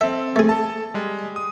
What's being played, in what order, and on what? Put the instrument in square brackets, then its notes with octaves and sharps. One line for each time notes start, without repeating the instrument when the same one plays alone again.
[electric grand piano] C4 A4 [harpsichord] E5
[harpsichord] A3 G#4
[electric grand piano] A4 A5
G3 G#3
D#6